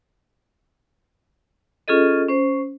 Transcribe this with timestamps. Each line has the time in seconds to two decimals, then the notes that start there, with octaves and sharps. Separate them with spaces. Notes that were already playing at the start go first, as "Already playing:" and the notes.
1.88 C#4 F4 G#4 A4 D#5
2.28 C#4 C5